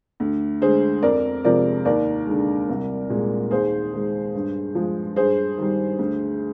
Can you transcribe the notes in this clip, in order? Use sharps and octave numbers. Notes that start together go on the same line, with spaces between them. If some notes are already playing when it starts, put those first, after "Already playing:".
D2
D3 G#3 G#4 C5
F2 A#4 D5
C3 F3 G#3 A#4 D5
D#2 A#4 D5
D3 G#3
C2
A#2 G#3
D#2 G#4 C5
D#3 G#3
G2
F3 G#3
G2 G#4 C5
D#3 G3
D2